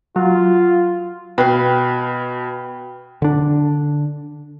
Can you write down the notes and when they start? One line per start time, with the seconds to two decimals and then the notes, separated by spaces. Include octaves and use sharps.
0.16 F#3 F4
1.38 B2 B4 F5 G5
3.22 D3 D4